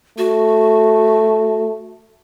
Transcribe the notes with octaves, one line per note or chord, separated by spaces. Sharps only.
A3 F#4